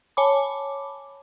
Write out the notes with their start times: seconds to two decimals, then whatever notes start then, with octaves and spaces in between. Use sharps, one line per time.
0.17 C#5 G#5 A5 B5 D6